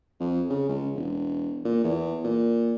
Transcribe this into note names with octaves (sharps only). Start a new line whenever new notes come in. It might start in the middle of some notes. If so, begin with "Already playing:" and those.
F2
C#3
C#2
E1
A#2
E2
A#2